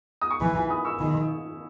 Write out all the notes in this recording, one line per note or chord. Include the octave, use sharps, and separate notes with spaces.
D#6
C#6
E3 G#5 B5
G#5 B5
B5 D#6
C#6 E6
D#3 G#5 B5